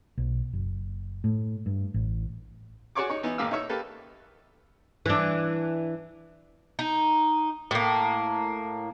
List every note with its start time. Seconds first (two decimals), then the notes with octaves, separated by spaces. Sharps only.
0.18 B1
0.53 F#1
1.24 A2
1.66 G2
1.94 A1
2.95 F#4 G#4 C#5 D5 C#6 D6
3.09 D#4 C#5
3.23 E3 B3 D#4
3.38 G#1 A#2 A#3 F5 D6 E6
3.51 D#4 E4 C#5 E5
3.69 A#3 G4 A4 B4
5.06 E3 D4
6.79 D#4
7.71 A2 A#3